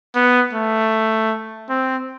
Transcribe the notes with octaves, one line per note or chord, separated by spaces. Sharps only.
B3
A3
C4